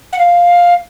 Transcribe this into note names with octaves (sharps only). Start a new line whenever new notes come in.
F#5
F5